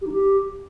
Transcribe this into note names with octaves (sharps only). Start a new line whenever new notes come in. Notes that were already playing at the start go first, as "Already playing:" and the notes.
G4
D#4
G4